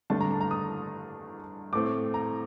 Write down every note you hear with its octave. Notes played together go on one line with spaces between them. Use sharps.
G2 D3 A3 D4 A5
A#5
A5
A#5
D#6
A2 A3 C4 D6
A#5